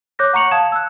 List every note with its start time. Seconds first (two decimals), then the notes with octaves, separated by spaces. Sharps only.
0.19 C#5 D6 F#6 G6 A#6
0.33 F#5 A#5 C#6 C#7 F7 F#7
0.51 F5 A5 D#6 G#6 E7
0.72 E6 F#6